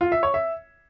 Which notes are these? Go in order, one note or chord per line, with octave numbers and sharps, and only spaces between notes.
F4
E5
C#5
E5